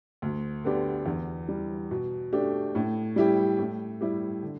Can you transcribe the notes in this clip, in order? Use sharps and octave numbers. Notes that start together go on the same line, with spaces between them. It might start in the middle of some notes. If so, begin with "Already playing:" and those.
D2
D3 B3 D4 G4
E2
E3 G3
B2
A3 D4 G4
A2
G3 E4 G4
A2
G3 E4 G4
D3